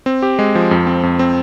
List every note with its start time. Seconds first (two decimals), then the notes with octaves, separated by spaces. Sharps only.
0.06 C4
0.22 G4
0.39 G#3
0.55 F3
0.71 F2
0.87 C4
1.03 F2
1.19 C4